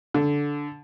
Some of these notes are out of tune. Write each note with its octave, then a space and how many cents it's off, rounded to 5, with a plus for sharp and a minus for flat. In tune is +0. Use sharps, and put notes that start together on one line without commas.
D3 -15